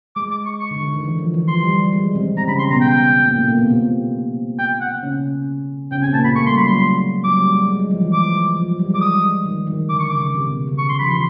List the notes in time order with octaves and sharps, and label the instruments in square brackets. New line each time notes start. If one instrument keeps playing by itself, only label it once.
[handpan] G#3 [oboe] D6
[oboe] D6
C#6
C#6
[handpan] D3
D3
D#3
E3
F3
E3
[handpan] F3 [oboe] C6
[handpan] G3
G#3
C3 C4
[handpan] C3 C4 [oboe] A#5
[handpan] C#3 C#4 [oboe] B5
[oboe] C6
[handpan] B2 B3 [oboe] A#5
[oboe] G5
[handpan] A#2 A#3
A3
A#2 A#3
B2 B3
C3 C4
[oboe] G5
F#5
[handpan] C#3 C#4
[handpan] C#3 C#4 [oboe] G5
[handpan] C3 C4 [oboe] G#5
[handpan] A#2 A#3 [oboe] A5
[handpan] A#2 A#3 [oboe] B5
[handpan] A3 [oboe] C#6
[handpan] G3 [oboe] C6
[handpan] F#3 [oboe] B5
[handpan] F#3 [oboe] C6
[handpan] F#3 [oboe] D6
[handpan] G3
G#3
G#3
F#3
F3
E3
[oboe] D6
[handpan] F3
F#3
G3
[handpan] G#3 [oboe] D6
[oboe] D#6
[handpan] D#3
D#3
[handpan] D3 [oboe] D6
[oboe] C#6
[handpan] C#3 [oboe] D6
[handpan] C3
B2
C#3
[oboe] C#6
C6
[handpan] F3 [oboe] B5
[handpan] E3 [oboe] C6